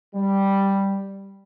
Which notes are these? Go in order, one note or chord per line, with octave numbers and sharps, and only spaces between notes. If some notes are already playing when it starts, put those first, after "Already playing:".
G3